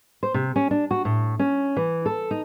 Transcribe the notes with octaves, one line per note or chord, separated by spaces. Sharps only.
C5
C3
C#4
D4
F#4
A2
C#4
E3
A4
D#4